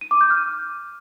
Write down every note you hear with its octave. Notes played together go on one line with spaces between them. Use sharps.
D#7
D6
G6
F6